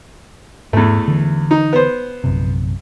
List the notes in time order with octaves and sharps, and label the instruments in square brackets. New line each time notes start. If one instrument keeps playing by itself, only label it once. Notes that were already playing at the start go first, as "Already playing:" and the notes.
[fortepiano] E2 A3 [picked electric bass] G#2
[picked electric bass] D3 E3
[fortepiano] D#4
B3 C5
[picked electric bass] A#1 F#2 C3